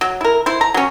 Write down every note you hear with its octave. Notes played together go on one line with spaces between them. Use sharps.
F#3
E4 A#4
E4 C5
A#5
F#3 C#4